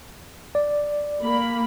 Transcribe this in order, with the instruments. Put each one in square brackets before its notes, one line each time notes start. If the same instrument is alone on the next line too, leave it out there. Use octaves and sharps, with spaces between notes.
[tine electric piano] D5
[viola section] A#3 B5